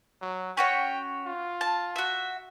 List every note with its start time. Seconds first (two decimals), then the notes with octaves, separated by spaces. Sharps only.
0.21 F#3
0.57 C#4 F#4 C#5 G5
1.26 F4
1.61 A5
1.96 F#4 E5